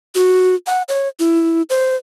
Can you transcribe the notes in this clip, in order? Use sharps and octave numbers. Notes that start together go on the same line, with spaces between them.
F#4
F#5
C#5
E4
C5